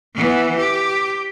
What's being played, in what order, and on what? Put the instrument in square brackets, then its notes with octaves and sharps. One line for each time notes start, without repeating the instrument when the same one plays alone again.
[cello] E3 B3
G4